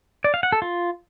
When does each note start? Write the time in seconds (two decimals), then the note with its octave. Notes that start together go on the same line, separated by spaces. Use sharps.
0.24 D5
0.34 F5
0.43 F#5
0.52 A4
0.62 F4